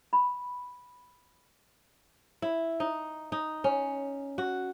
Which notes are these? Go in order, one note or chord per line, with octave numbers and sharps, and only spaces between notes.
B5
E4
D#4
D#4
C#4
F#4